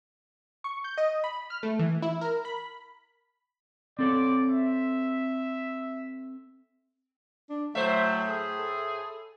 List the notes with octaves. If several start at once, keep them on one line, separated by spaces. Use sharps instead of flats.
C#6
G6
D#5
B5
F6
A3
E3
E4
A#4
B5
C4 A4 C#5 D5
E5
D4
A2 F#3 A3 C5 E5
G#4
A4